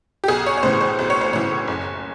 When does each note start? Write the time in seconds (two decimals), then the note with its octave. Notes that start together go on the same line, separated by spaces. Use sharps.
0.24 G4
0.28 B1 G#4
0.46 C#5
0.58 C#5
0.63 A2 E3 C5
0.81 C5
0.99 B1
1.10 C#5
1.21 C5
1.33 A2 E3 C#5
1.68 F#1